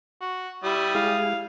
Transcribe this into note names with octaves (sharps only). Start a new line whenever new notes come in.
F#4
G3 E4 D#6
G#3 E4 G#4 F5